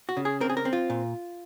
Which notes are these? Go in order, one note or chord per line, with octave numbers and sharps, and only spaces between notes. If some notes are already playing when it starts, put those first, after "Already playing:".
F#4
C#3
G#4
C4 A#4
G#4
A#4
C4
F4
A#2